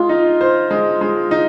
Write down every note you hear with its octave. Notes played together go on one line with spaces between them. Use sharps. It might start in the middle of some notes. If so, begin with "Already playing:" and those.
Already playing: G#3 F4
D#4
C5
G#3
G#3
D#4